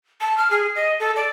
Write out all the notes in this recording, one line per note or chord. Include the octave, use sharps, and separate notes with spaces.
A5
F6
G#4
D#5
A4
D5